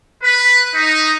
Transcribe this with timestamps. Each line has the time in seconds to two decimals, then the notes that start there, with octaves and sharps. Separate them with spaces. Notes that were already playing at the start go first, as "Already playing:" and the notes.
0.23 B4
0.75 D#4